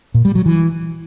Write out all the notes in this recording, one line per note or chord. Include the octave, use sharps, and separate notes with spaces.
A#2
G3
F#3
E3